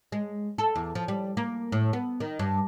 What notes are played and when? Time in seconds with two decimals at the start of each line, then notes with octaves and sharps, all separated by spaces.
0.12 G#3
0.58 A4
0.75 E2
0.95 F3
1.08 G3
1.37 A#3
1.72 A2
1.93 B3
2.20 D#3
2.39 G2